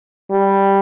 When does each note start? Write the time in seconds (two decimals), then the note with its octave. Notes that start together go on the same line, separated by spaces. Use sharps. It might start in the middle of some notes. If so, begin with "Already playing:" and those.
0.31 G3